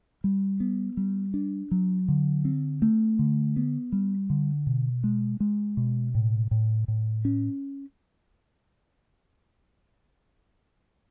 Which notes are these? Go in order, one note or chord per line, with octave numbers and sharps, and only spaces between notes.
G3
B3
G3
D4
F#3
D3
C4
A3
D3
B3
G3
D3
B2
G#3
G#3
B2
A2
A2
A2
C#4